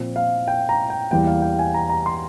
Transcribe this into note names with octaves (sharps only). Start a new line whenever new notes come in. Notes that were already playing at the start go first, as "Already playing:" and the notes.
Already playing: A#2 F3 C4
F5
G5
A#5
G5
E2 E3 G3 A#3 G5
F5
G5
G#5
A#5
A#5
C6